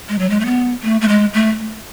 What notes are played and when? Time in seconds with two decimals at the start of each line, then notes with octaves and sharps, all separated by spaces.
0.09 G#3
0.19 F#3
0.30 G#3
0.40 A3
0.46 B3
0.83 A3
1.01 A3
1.08 G#3
1.33 A3